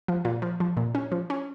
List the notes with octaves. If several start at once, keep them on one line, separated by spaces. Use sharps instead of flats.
F3
A#2
F3
F3
A#2
C#4
F3
C#4